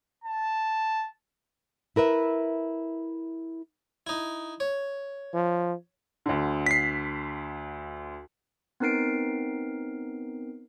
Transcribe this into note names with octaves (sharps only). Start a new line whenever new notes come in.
A5
E4 A#4 B4 E5
D#4 E4
C#5
F3
D2 D3
B6 C7
B3 C4 D#4 A#4 C7 D7